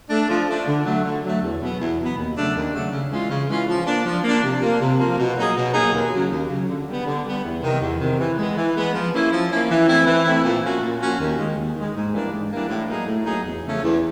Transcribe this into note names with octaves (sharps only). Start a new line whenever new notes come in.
A3 D4
F3
A3 D4
D3
F#3 A3
D3
F#3 A3
E2
B2 F#3 B3
E2
B2 F#3 B3
D#2
C#3 F#3 A3 D4
D#2
C#3 F#3 A3 D4
C#3
E3 G#3 C#4 F4
C#3
E3 G#3 C#4 F4
F3
A#3 D4
F3
A#3 D4
C3
F3 A#3
C3
F3 A#3
B2
F#3 A#3 D#4 G#4
B2
F#3 A#3 D#4 G#4
D#2
C#3 F#3
D#2
C#3 F#3
D3
G3 B3
D3
G3 B3
E2
C3 D#3
E2
C3 D#3
E3
G#3 B3
E3
G#3 B3
F3
A#3 C#4 E4
F3
A#3 C#4 E4
E3
A3 C4 E4
E3
A3 C4 E4
A#2
F3 A#3 C#4 F#4
A#2
F3 A#3 C#4 F#4
D#2
D#3 G#3
D#2
D#3 G#3
G#2
E3 G3 A#3 D4
G#2
E3 G3 A#3 D4
A2
F#3 A#3 D#4 G#4
A2
F#3 A#3 D#4 G#4
E2
C#3 F3 A3 C#4
E2